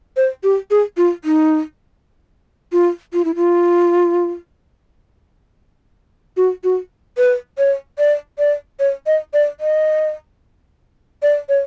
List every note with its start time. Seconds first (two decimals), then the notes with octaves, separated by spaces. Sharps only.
0.17 C5
0.43 G4
0.71 G#4
0.97 F4
1.24 D#4
2.73 F4
3.13 F4
3.25 E4
3.36 F4
6.37 F#4
6.64 F#4
7.18 B4
7.58 C#5
7.99 D5
8.39 D5
8.80 C#5
9.07 D#5
9.34 D5
9.60 D#5
11.22 D5
11.49 C#5